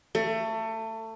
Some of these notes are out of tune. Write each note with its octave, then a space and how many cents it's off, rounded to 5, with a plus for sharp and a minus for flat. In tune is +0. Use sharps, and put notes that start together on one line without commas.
A3 +25